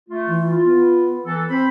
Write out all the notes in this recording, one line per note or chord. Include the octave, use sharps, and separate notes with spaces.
A3 F4
E3
F4
B3
E3 A4
C4 C5 B5